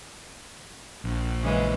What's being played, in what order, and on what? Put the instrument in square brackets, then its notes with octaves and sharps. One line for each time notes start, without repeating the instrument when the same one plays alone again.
[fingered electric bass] A#1
[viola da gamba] C#3 E3 G#3